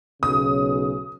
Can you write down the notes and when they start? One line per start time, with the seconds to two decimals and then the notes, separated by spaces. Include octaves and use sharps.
0.23 B1 C#3 D#6